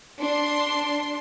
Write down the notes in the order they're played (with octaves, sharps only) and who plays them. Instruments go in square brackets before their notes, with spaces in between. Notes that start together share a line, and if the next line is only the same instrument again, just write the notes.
[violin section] D4 C6